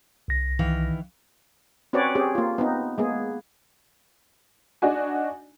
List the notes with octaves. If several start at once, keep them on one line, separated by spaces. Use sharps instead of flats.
C2 A#6
D#3 E3 F5
C4 C#4 F#4 B4 C#5 D5
C4 C#4 G4 G#4
A#3 F4
B3 C4 D#4
G#3 A#3 B3 G#4
D4 D#4 F#4 G#5